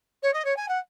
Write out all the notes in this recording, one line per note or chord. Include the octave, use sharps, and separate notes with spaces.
C#5
D#5
C#5
G#5
F#5